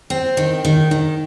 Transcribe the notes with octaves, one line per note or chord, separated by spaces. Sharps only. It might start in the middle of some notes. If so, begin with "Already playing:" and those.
C4
D#3
D#3
D#3